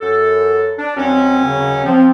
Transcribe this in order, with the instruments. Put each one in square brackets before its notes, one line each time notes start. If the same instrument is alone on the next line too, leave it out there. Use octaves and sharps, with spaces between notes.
[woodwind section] F#2 A4
D4
[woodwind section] D#2 F#3 C#4 [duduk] C4
[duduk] C#3
[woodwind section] F3 [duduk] C4